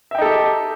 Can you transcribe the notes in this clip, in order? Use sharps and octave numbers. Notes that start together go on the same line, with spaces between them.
D#4 G4 A4 E5 G5